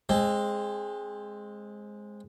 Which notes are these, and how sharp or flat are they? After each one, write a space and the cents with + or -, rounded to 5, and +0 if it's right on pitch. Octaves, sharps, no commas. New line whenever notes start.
G#3 +0 C4 +20